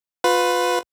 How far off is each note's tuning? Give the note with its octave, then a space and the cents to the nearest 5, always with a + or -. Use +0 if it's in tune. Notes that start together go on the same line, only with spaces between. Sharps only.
F4 +30 B4 +15